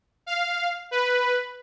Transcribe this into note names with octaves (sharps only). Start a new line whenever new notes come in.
F5
B4